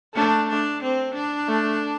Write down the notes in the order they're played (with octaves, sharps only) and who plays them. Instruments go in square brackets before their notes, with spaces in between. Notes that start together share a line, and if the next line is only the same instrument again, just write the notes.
[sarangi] A3 [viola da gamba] D4
[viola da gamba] D4
C4
D4
[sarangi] A3